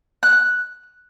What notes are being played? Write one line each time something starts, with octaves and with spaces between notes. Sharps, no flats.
F#6